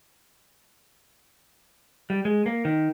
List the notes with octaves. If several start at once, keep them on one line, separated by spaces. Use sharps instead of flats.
G3
G#3
A#3
D#3